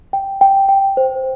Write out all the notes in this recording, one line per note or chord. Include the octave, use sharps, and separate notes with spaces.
G5
G5
G5
C5